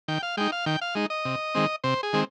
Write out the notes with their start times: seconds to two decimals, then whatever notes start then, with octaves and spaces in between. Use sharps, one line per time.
0.08 D#3 G5
0.23 F5
0.37 G#3 D#4 G5
0.52 F5
0.66 D#3 G5
0.81 F5
0.95 G#3 D#4
1.10 D#5
1.25 C3
1.55 D#3 G#3 C4
1.84 C3 C5
2.03 G#4
2.13 D#3 G#3 C4